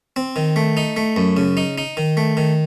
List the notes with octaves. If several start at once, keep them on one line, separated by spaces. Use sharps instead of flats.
C4
D#3
A3
D#4
A3
F#2
C#3
D#4
D#4
D#3
A3
D#3